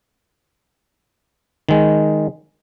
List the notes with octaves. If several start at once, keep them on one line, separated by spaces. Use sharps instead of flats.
D#3 G#3